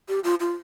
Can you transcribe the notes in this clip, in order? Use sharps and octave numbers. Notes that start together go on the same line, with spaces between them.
G4
F4
F4